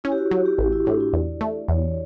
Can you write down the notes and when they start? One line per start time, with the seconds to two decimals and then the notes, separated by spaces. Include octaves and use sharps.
0.04 C#4 E4
0.12 G4
0.18 F#4
0.31 F#3
0.46 G4
0.58 A1
0.72 E4
0.86 A2 D4
1.00 E4
1.13 E2 D5
1.41 A3 D5
1.68 E2 C#5